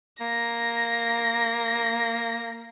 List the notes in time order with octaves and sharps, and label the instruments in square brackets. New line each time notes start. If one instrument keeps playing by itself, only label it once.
[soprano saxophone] A#3 [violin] A#6